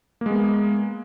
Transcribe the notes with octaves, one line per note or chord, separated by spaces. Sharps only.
G#3 A#3 B3